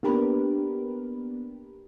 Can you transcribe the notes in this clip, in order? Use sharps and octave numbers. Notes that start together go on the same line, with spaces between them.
A#3 B3 D4 G4 A#4 B4